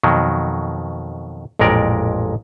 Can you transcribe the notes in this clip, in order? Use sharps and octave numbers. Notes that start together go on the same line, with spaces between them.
F2 B2 D#3 F#3
A1 F2 A#2 G#3 A#4 D5